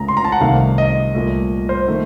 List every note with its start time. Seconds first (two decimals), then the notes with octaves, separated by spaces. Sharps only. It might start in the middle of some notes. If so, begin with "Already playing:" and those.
Already playing: C#2 C#3 A3 A#5
0.08 C6
0.17 A#5
0.25 A5
0.32 F#5
0.41 C2 C3 D#3 A3 F5
0.78 D#5
1.15 C2 A#2 A3
1.69 C5
1.88 D#3 A3